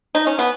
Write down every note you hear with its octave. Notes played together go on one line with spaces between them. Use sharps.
D#4
C#4
B3